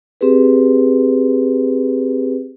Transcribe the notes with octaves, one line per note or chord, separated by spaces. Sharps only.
C4 G4 G#4 B4